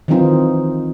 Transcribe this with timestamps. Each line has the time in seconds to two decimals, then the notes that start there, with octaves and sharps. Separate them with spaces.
0.08 D#3 E3 F#3 C4 D#4 F4